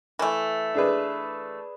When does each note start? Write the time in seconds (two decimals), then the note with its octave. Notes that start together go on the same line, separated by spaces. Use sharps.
0.19 E3 A3
0.74 D4 G#4 B4